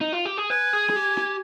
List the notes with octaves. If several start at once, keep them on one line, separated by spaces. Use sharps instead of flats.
D#4
F4
G4
G#4
B4 G#5
G#4
G#4
G4
G4